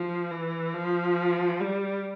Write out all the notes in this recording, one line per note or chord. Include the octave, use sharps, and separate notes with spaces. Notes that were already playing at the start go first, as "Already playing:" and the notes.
Already playing: F3
E3
F3
G3